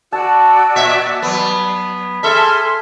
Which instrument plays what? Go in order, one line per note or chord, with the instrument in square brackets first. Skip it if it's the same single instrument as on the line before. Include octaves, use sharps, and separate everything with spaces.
[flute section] F#4 D5 E6 [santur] A5
[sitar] A#2 E5
F#3 B3
[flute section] G#4 C6 F6 [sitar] A4 E5